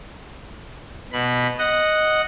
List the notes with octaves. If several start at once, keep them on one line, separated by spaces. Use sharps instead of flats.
B2 B5
D#5 F#5